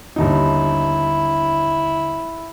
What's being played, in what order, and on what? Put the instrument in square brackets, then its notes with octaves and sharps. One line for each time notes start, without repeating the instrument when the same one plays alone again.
[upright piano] G1 D#2 D#4 [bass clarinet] E4